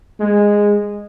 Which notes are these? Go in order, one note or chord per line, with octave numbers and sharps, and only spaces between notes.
G#3